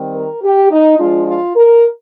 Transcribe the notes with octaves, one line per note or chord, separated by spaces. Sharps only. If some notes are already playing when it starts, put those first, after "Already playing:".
Already playing: D#3 G3 C4
A#4
G4
D#4
F3 G#3 D4 F4
F4
A#4